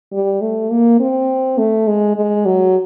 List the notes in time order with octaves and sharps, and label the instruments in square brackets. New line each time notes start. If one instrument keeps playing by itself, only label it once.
[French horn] G3
A3
A#3
C4
A3
G#3
G#3
F#3